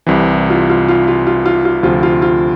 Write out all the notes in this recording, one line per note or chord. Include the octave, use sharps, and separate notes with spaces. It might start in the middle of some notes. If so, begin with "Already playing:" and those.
C2 C3 E3
F4
F4
F4
F4
F4
F4
F4
D2 C3 F3 F4
F4
F4